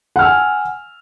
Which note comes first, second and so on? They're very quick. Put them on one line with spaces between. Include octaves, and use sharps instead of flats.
F#5 F6 E6 G#5